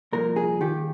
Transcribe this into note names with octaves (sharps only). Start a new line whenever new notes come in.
C2 A#2 F3 A#4
G#4
D#2 D#3 G4